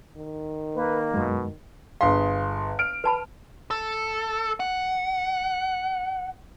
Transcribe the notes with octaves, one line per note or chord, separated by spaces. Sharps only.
D#3
A#3 B4
F#2 B2 G#3
G1 G#4 F5 C6
F6 D7
B4 A5 B5
A4
F#5